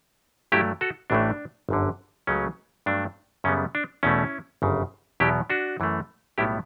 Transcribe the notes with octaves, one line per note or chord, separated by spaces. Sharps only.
G2 F#3 A3 E4 G4
F#4 A4
A1 A2 E3 A3 D4
G1 F#2 D3
C#2 C#3 F#3 A3 C#4
G2 F#3 A3 D4
F#2 C#3 G3 B3 C#4
D4
E2 B2 A3 C#4 E4
G1 F#2 C#3
E2 B2 F#3 B3 E4 G4
D4 F#4
F#2 E3 A3
B1 A2 G3 B3 E4 G4